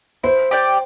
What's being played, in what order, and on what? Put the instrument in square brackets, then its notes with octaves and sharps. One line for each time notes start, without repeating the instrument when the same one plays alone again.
[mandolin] E4 [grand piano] C5
[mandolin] G4 D5 G5